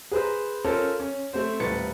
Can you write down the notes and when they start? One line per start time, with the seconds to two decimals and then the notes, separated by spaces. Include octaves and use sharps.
0.11 G#4 B4 C5 A#5
0.65 C#4 F4 A4 A#4 C5
1.00 C#4
1.33 A3 C4 C5
1.60 D#1 A2 B4 A6 C#7